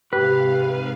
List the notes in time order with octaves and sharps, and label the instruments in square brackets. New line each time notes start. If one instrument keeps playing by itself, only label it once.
[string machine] G#2 C3 F5 [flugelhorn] G4 [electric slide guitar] B4